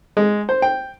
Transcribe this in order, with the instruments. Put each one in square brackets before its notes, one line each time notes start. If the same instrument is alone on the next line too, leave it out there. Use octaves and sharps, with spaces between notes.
[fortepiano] G#3
C5
G5